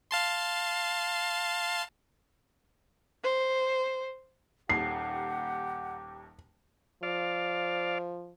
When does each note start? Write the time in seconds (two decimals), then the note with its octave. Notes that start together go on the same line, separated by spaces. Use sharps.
0.11 F5 A5 C6
3.24 C5
4.69 D#1 D#2 G4 F#5 C7
7.03 F3 D5 F5